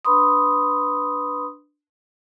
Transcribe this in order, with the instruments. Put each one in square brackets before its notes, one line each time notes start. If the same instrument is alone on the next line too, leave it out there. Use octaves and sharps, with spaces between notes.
[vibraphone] D4 B4 B5 C6 D#6